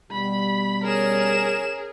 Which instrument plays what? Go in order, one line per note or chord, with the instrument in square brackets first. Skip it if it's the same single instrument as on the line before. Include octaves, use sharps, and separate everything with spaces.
[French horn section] B2 G3 [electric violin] B5
[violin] C#4 E7 [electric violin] G#4 A#4